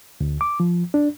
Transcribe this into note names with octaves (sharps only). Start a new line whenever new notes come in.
D2
D6
F3
D4